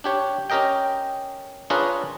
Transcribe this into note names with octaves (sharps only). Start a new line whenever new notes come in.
D4 G4 C#5
C#4 G4 A#4 D#5 G5
D4 F4 G#4 A#4 B4 C#5